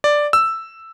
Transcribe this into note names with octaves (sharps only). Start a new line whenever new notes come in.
D5
E6